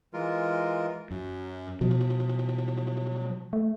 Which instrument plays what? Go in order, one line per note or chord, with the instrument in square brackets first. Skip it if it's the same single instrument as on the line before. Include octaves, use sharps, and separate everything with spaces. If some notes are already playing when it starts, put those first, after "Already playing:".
[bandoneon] E3 G#3 F4 A#4
[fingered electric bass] F#2
[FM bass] B2 [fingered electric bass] F3 F#3
[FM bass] A3